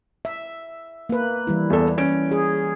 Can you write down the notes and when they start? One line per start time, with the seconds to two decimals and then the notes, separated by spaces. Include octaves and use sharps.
0.25 E5
1.09 A#3 B4
1.47 E3 G3 E4
1.70 E2 A4
1.98 C#4 D7
2.31 G#4